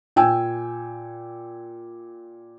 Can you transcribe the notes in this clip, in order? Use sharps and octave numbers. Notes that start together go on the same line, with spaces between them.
A#2 G5 G#5 E6